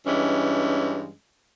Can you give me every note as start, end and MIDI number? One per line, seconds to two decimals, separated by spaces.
0.06 1.12 43
0.06 1.12 52
0.06 1.12 56
0.06 1.12 61